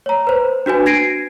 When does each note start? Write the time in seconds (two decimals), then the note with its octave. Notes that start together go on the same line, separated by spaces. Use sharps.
0.06 C#5 A#5
0.27 B4 C5
0.66 D4 F#4 B4 G#5
0.86 G#6 A#6 C7 D7 D#7